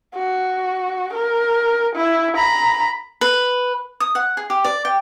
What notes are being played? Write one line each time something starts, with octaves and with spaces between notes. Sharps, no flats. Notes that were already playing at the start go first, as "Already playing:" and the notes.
F#4
A#4
E4
A#5 B5
B4
D#6
F#5
G#4
G4
D5
G5